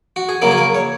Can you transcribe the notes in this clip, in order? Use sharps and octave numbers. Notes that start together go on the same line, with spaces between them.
F#4
G#4
C#3 F#3 A#3 A#4
G#4
A#4
C#5